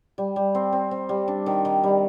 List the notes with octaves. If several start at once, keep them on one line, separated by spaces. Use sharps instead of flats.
G3
G3
C4
C4
C4
G3
D4
D#3
D#3
G3